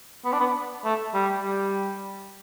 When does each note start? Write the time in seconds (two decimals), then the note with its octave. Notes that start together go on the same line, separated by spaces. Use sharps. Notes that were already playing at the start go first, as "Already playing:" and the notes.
0.25 B3
0.33 D4
0.39 B3
0.85 A3
1.14 G3
1.38 G3